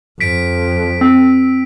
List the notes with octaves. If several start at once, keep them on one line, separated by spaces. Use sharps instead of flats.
F2 B6 D7
C4